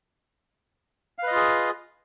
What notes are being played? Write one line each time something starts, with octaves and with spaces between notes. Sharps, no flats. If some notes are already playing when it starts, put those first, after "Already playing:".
F4 G#4 B4 D#5 F5